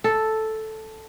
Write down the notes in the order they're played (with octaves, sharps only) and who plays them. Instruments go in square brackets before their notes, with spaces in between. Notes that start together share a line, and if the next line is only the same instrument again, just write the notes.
[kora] A4